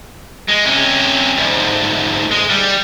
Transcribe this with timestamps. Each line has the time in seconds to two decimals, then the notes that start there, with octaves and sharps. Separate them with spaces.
0.49 G#3
0.65 C3 C#4
1.37 D2 G#2
2.31 G#3
2.50 G3